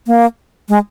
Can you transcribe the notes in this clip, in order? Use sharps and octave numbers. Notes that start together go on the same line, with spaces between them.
A#3
G#3